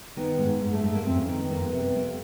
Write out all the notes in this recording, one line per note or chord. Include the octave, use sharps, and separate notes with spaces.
D#3 B3
G#2
G#2
A3
G#2 A3
A#3
F2 C4
C#4
D#3 C4
B3
F2 A#3
B3
C3
B3
F2 A#3